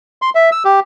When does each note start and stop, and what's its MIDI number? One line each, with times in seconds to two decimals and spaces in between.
0.22 0.30 84
0.35 0.50 76
0.52 0.63 88
0.65 0.80 67